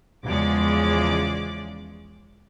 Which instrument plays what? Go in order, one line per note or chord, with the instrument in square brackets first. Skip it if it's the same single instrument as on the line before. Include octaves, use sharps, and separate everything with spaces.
[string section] E2 C#3 F3 G#3 D5 D6